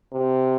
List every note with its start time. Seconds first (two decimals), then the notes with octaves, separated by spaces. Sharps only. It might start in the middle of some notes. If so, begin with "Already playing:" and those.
0.13 C3